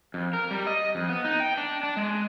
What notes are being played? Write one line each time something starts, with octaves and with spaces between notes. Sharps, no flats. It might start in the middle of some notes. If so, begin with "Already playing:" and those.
F2
A#4
G3
D#5
F2
B3
D#4
G5
D4
D4
G#3